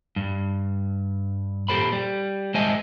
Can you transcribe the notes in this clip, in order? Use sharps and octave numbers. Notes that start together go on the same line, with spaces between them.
G2
A#2 G4 A4 C5 B5
G3
G#3 C5 D#5 E5 G#5 A5